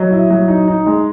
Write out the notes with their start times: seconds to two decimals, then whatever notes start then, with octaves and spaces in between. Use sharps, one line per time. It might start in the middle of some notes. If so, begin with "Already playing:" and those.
Already playing: F#3 D#5
0.11 E4
0.30 F#3
0.48 D#4
0.68 D#4
0.86 G#3